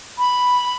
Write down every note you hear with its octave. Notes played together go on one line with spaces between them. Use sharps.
B5